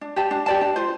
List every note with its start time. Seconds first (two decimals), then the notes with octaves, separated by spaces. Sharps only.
0.01 D4
0.16 G4 D5 A5
0.31 D4
0.46 G4 D5 A5
0.61 D4
0.76 F4 C5